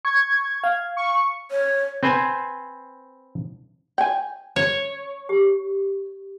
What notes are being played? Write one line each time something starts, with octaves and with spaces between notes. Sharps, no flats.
C#6 G#6
F5
C#6
C#5
C4 B4 C5 G#5
G5 G#5
C#5
G4